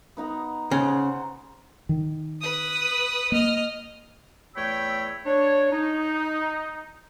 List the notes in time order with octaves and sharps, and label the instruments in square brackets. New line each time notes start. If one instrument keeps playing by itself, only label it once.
[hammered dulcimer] B3 D#4 A#5
[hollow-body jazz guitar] C#3 [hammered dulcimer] C5 F#5
[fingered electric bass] D#3
[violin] B4 D#6
[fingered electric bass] A#3 [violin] D#5 F6
[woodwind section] E2 A3 C#5 G5 B5 E6
D4 C#5
D#4